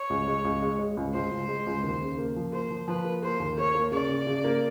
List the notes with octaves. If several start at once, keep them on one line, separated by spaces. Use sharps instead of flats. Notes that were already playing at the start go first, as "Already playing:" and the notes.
Already playing: C#5
C#2
G#3
C#2
G#3
G#3
C#2
C#2 C5
C#2
G#3
C#2
D#2
C#3
A#3
F3
A#3 C5
F3
F3 B4
A#3
A#3 C5
D#2
A#3 C#5
A#3
C#3 D5
C#3
C#3
A#3